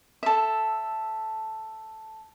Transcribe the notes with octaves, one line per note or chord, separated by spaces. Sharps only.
A4 E5